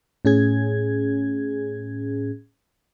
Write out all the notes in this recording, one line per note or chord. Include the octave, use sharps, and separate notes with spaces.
A2 C#4 G#4 G#6